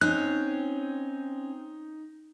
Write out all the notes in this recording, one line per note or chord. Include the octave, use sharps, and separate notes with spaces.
C4 C#4 D#4 F#6